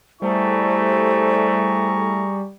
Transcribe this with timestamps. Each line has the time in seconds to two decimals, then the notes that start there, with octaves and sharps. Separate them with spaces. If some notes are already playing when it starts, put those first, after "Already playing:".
0.22 G3 A3 E4 G#4 C5 A#5 C#6